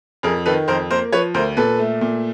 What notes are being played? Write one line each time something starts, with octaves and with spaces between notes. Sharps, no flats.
F2 G#4 A#4
D#3 A4 B4
F2 A#4 C5
A#3 A#4 C5
F3 B4 C#5
D2 A#4 C5
A#2 A4 B4
A3
A#2